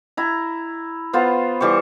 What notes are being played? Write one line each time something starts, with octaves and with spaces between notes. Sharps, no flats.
E4 A#5
B3 F4 C5 F5
E3 G3 C5 C#6